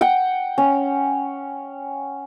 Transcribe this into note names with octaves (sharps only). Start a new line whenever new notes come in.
F#5 G5
C#4